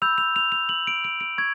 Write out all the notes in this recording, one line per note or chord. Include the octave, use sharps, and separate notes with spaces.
B5 E6 G6 F7
F7
F7
F7
F#7
D7
D7
D7
C#6 G#6